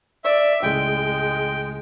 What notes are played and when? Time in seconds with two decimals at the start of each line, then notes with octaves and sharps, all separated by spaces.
0.25 D5 E5
0.63 C#2 A2 G#3 G5